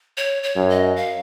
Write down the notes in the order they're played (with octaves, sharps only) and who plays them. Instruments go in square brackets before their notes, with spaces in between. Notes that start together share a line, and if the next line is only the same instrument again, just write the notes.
[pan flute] C#5
C#5
[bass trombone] F#2
[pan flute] D#5
F5